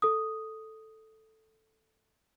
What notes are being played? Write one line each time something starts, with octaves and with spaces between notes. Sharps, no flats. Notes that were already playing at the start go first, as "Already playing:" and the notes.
A4 D#6